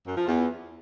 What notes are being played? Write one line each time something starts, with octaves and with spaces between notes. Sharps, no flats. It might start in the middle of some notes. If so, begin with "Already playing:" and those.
F#2
F3
E2